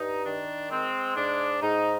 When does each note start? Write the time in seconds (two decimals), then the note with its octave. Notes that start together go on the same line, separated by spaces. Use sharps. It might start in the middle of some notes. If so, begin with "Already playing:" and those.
Already playing: G2 D#4
0.25 D#3 D4
0.70 G#3 C4
1.16 G#2 D4
1.62 G#2 D#4